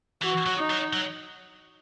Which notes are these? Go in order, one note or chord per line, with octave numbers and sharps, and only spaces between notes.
E3 F#4
F#3
D#4
F#3
F#3